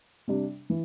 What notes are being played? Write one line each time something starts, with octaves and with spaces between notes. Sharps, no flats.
C3 G3 D4
E3